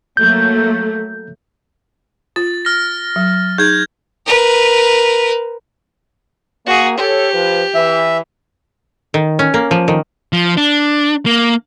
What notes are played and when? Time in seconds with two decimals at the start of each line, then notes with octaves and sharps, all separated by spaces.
0.17 F#3 A3 A#3 G6
2.36 F4 A6
2.65 F6 A#6
3.16 F#3
3.58 D#4 G#4 G6 G#6
4.26 A#4 B4
6.66 A#3 F#4 G#4
6.98 G4 A4 C#5
7.34 F3 B4
7.75 E3 E5
9.14 D#3
9.39 C#4
9.54 A#3
9.71 F3
9.88 D#3
10.33 F3
10.57 D4
11.26 A#3